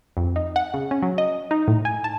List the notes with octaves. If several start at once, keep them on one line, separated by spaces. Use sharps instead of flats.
F2
D#4
F#5
C#3
C#4
F#3
D#5
D#4
A2
G#5
A5